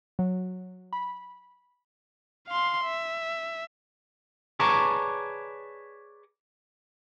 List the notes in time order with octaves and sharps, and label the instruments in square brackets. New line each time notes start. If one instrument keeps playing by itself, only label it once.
[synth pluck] F#3
B5
[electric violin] F5 C6
E5
[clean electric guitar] G#4 B4 C#5 D5 A5 A#5